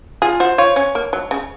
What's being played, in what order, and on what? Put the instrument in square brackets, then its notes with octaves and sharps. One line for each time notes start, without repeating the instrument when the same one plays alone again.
[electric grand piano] F4 [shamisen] G#4
[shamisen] F#4 [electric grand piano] C5
[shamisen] F4 [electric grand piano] C#5
[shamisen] C#4 [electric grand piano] C#5
[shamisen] A#3
F#3
C#3